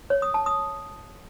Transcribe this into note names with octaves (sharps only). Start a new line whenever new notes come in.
C#5
D#6
A5
D#6